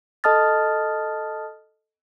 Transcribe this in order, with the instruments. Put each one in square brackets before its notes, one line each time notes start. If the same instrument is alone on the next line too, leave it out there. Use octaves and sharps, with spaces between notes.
[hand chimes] A4 D#5 A5 D#6 F6 A6